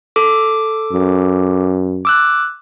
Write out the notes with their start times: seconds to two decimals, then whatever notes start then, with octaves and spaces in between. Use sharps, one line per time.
0.16 A4 D6
0.93 F#2
2.05 D6 E6 F#6